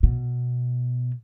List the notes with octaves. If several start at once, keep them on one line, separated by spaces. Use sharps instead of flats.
B2